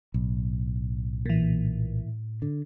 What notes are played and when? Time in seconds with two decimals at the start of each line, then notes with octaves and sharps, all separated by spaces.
0.14 B1 A2
1.26 A#2 E3
2.42 D3